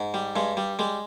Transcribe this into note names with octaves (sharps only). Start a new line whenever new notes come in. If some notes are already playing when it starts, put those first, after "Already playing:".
Already playing: G#2
G3
G2 G#3
G3
G3 G#3